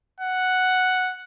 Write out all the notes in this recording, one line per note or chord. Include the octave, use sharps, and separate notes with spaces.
F#5